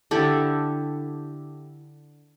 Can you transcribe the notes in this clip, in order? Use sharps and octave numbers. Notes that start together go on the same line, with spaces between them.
D3 E4 G4 A4